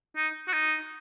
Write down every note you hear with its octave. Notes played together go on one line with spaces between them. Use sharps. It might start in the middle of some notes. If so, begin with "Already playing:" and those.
D#4
F#4
D#4